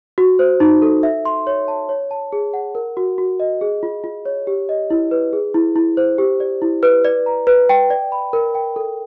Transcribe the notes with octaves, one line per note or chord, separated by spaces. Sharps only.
F#4
C5
D#4
A4
E5
C6
C#5
A5
C#5
A5
G#4
F#5
A#4
F#4
F#4
D#5
G#4
F4
F4
C#5
G4
D#5
E4
B4
G#4
E4
E4
C5
G4
D5
E4
B4
D5
A#5
B4
G5
D5
B5
A#4
G5
A4